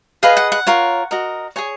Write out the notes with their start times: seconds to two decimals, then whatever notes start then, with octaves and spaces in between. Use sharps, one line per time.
0.23 G#4 B4 D#5 F5
0.37 F#5
0.52 F#5
0.67 F4 A#4 C#5
1.11 F#4 A#4 D#5
1.56 G#4 C#5 G#5